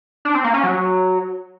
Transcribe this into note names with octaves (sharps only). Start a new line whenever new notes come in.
D4
C4
A#3
C#4
F#3